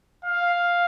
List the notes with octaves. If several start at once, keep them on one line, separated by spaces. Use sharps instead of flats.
F5